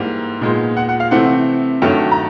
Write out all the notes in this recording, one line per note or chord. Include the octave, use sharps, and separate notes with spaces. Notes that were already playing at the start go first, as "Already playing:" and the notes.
Already playing: G#2 E3 G3 A#3
A#2 F3 G#3 B3 D#4
F#5
F#5
F5
C3 E3 A3 C4 F#5
G2 D#3 F#3 A3 G5
A#5